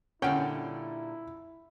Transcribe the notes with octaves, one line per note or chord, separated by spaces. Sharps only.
A#2 D3 G3 C#4 E4 F#5 G5